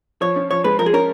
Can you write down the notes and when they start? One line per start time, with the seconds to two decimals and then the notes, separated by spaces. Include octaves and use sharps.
0.21 F3 C#5
0.36 C#4
0.51 F3 C#5
0.64 G#3 B4
0.79 F3 A#4
0.86 G#4
0.93 C#4 A#4